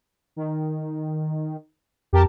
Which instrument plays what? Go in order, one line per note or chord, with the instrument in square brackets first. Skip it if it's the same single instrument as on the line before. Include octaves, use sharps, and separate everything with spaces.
[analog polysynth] D#3
[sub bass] F2 [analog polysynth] G4 A#4 A5